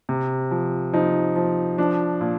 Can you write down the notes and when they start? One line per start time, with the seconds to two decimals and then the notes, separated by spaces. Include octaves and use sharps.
0.09 C3
0.51 F3
0.93 F3 D#4
1.36 F3
1.78 F3 D4
2.21 A#2